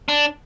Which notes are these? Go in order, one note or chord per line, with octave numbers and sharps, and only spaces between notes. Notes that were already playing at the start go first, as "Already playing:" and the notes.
D4